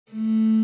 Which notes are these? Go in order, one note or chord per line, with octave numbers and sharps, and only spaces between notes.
A3